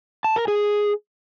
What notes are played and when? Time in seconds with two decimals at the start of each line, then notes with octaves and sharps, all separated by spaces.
0.24 A5
0.36 A#4
0.48 G#4